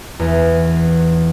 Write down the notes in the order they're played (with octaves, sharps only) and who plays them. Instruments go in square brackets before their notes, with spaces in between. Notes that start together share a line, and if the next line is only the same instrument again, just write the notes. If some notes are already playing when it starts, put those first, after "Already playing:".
[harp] E2